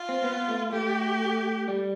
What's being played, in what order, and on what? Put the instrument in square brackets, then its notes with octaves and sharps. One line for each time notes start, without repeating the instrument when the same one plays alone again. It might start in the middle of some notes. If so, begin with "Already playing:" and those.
Already playing: [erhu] F4
[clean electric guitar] C4
B3
A3
[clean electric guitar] A3 [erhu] G4
[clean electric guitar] G3